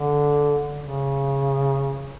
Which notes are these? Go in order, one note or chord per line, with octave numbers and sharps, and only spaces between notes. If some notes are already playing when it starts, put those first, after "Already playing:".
Already playing: D3
C#3